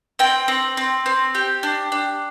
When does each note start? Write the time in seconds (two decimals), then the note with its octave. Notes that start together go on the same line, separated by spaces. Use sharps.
0.19 C4 G5
0.48 C4
0.77 C4
1.06 C4
1.35 G4
1.63 D4
1.92 D4